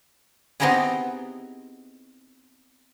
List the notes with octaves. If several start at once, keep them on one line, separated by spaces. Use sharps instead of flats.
B3 C4 D#4 E4 G4 G#4